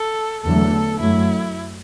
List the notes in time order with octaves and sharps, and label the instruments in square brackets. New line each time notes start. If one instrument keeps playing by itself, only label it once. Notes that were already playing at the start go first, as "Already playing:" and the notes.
Already playing: [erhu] A4
[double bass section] E2 D3 F#3 A3 [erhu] A4
[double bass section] F#2 F#3 A3 [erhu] E4